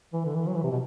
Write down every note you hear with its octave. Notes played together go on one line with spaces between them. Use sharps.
E3
D3
E3
F#3
E3
C3
B2